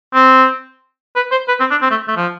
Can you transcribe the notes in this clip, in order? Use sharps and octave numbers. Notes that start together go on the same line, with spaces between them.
C4
B4
C5
B4
C4
D4
C4
A3
A3
F3